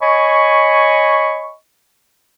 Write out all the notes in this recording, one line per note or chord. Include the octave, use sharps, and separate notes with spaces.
C#5 D#5 G#5 B5 C#6